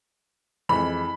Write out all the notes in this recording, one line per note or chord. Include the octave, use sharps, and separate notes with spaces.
F2 E3 G#3 B5